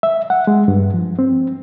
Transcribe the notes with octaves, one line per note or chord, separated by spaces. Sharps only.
E5
F#5
G#3
G2
F3
C4